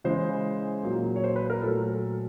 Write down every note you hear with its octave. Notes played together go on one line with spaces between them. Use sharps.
C#3 E3 G#3 C5
A#2 F#3 A#3
C#5
C5
B4
A#4
A#2 F#3 A3 A4